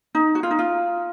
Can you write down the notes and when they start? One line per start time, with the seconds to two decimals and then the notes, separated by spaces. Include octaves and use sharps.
0.15 D#4
0.35 F#4
0.43 F4
0.51 D#4
0.59 F4